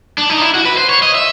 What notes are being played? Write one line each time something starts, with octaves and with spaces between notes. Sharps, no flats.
D4
D#4
E4
F#4
B4
C5
C#5
D#5
E5